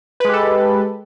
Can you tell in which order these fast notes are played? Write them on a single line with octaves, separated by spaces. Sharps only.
B4 G#3 G4 A4